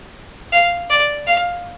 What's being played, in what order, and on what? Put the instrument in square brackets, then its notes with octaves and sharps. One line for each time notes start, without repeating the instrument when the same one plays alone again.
[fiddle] F5
D5
F5